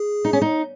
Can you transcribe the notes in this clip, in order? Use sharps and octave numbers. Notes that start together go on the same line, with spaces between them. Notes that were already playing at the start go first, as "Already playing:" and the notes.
Already playing: G#4
D#4
C#4
D#4